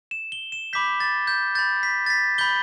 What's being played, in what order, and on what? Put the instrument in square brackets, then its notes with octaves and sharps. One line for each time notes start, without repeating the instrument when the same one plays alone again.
[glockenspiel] E7
G7
E7
B5 D6 G6 B6
A6
G6
B5 G6 A6
B6
A6
B6
B5 G6 G7